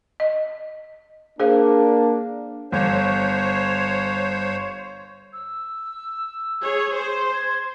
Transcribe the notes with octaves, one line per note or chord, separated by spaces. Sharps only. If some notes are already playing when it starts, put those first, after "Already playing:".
D#5
A#3 D4 G#4 C5 F5
G1 C5 C#5
E6
G#4 C#5
C5
G#6